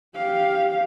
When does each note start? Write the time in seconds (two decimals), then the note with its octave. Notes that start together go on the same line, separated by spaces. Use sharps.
0.15 G4 F5